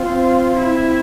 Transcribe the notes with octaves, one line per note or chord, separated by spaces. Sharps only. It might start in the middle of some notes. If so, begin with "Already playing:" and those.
Already playing: C4 F4
E4